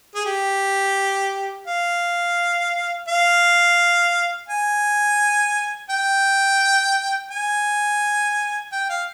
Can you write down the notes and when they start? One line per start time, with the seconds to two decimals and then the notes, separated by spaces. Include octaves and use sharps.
0.15 G#4
0.25 G4
1.67 F5
3.08 F5
4.48 G#5
5.90 G5
7.31 G#5
8.72 G5
8.89 F5